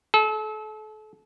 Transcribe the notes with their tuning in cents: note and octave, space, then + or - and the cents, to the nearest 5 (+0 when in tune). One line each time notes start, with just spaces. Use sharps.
A4 -35